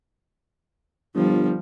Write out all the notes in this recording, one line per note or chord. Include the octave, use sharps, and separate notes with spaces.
G1 F3 G3